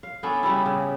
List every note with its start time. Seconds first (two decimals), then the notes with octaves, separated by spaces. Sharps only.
0.03 F5
0.23 B3 C#4 D4 A4
0.43 C#3 G3 B3 E4
0.66 C#3